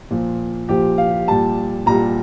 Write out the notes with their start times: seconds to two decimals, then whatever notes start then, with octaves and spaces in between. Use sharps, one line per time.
0.10 A#2 F3
0.69 A#2 F3 G4
0.98 F5
1.28 A#2 G3 A5
1.86 A#2 G3 A#5